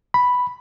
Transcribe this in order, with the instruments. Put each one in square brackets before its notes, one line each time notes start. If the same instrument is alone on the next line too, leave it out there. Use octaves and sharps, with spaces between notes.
[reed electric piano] B5